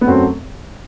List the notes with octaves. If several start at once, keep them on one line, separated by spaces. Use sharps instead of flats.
B3
F#2 F#3 A3 C4